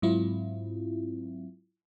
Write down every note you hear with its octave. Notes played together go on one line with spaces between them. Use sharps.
G#2 F#3 C4 E4 F4